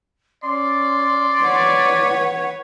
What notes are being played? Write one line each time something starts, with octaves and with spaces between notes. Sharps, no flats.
C#4 D5 C6
B4 C#5 F#5